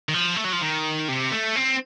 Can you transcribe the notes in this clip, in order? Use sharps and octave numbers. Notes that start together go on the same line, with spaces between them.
D#3
F3
A3
F#3
F3
D#3
C3
A3
C4